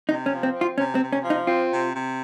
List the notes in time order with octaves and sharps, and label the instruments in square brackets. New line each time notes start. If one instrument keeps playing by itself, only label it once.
[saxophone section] C3 [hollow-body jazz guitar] D#4
[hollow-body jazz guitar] C#4
[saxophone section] F3
[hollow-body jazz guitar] C4
[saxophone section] C4
[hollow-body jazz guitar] F4
[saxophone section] C3 [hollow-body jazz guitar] C#4
[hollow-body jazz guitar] C4
[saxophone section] C3
[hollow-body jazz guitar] C#4
[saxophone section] F3
[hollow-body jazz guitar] D#4
[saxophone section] C4 [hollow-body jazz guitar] F4
[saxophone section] C3
C3